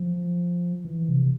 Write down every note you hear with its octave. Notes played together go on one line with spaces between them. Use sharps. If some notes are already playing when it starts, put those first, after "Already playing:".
Already playing: F3
E3
C3